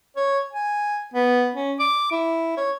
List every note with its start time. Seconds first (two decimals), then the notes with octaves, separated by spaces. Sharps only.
0.17 C#5
0.53 G#5
1.14 B3
1.55 C#4
1.80 D6
2.12 E4
2.57 C#5